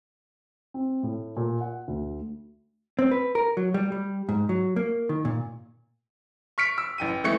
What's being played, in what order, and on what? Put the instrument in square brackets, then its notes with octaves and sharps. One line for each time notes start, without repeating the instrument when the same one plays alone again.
[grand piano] C4
A2
A#2
F#5
D2
[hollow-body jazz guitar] C4
B4
A#4
F#3
G3
G3
G#2
F#3
A#3
D#3
A#2
[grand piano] C#6 F6 B6 C#7 D7
E6
A1 G5 D#7
E3 G#3 A3 E5 C#6 C#7